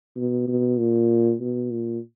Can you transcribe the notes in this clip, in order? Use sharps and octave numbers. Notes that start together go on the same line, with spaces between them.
B2
B2
A#2
B2
A#2